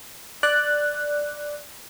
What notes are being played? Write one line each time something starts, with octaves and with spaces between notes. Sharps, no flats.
D5 F#6